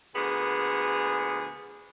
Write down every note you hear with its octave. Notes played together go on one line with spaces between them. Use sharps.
D2 A#2 B3 G#4